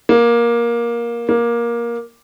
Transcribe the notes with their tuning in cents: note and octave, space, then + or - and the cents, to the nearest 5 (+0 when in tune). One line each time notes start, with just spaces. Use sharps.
A#3 +15
A#3 +15